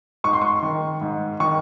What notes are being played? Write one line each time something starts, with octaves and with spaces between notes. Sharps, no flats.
G#2 C#6
C6
C#6
D#3
G#2
D#3 C#6